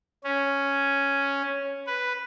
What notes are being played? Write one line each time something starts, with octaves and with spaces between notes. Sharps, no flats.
C#4
B4